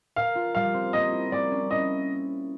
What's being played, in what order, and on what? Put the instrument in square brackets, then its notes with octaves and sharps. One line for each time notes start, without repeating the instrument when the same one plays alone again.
[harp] A#4 [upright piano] F5
[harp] F4
[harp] G3 [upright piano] F5
[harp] C4
[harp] A#3 [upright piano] D#5
[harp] E4
[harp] A#3 [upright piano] D5
[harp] C#4
[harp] E4 [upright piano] D#5